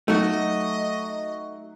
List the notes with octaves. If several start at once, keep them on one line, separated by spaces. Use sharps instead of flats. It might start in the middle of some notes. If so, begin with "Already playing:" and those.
F#3 A3 D#4 F#4 D#5